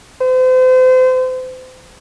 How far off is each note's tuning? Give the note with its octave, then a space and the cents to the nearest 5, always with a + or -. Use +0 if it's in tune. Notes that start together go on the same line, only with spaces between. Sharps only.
C5 -35